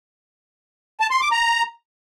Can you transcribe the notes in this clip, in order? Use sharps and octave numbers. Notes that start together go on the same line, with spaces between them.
A5
C6
D6
A#5